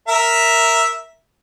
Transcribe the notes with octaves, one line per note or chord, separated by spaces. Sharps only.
A#4 E5